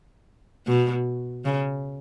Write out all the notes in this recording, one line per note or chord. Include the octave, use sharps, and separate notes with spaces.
B2
C#3